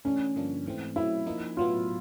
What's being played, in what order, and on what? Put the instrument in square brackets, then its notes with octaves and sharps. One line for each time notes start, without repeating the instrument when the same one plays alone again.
[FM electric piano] E3 A3 D4 [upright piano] C#4
[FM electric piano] G2 D3 F3 A#3 D4
G#2 E3 A3 C4
[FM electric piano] F#3 A3 C4 [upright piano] E4
[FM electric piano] F3 A#3 D#4
[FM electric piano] A2 F#3 B3 [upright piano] F4